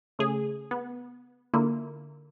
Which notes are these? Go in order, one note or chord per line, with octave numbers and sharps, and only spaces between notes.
C#3 A3 G#4
B3
D3 A#3 E4 F4